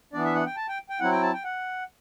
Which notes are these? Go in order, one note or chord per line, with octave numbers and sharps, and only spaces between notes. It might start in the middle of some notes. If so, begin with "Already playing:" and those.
E3 B3 D4 D5
E5
F#5
G5
A5
G5
G5
F#3 C4 E4 F#5
G5
A5
G5
F#5